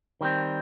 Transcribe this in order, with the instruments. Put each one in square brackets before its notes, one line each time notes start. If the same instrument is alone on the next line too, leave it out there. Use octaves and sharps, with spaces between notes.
[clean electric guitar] D#3 G3 C4